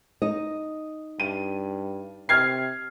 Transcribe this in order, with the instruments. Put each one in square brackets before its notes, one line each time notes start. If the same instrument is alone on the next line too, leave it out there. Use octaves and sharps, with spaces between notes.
[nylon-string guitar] D#4 D#5
[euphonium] G2 [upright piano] D#7
[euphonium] C3 [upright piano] F6 G#6 C7